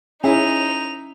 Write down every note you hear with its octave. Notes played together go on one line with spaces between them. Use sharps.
C#4 D#4 E4 G#4 F7